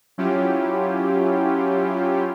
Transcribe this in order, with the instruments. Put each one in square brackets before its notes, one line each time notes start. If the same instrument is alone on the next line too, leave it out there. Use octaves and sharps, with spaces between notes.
[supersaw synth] F#3 C#4 E4 F4 G4